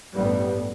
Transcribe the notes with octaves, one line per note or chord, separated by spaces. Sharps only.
A1 G2 G3 B3